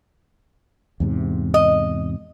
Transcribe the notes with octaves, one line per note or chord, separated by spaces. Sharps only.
E2 G#2 C3
D#5